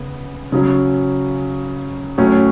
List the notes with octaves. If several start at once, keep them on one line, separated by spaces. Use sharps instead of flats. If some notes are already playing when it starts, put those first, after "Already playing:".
Already playing: C#3 B3
C#3 F#3 C#4
A2 F#3 C#4